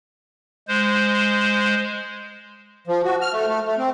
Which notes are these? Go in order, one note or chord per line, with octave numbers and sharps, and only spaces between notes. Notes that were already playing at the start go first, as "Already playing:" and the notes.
G#3 C5
F3
F#4
F6
A3
A3
A3
C4